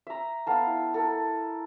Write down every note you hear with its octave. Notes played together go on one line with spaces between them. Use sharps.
E5 A#5
B3 A4 F5 A5
E4
A4 A#4